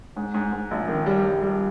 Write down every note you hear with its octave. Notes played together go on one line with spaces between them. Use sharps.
G#2
G#2
G#2
A#1
D#3
G3
G3
G3